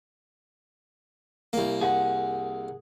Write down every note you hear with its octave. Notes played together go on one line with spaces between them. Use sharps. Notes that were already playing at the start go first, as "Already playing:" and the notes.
C2 A#3
G#4 F#5